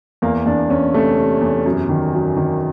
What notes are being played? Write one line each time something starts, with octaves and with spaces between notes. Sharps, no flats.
E2 A#3
E2 D4
E2 C#4
C3 A3
C3
E2
F#2
D#3
F#2
D#3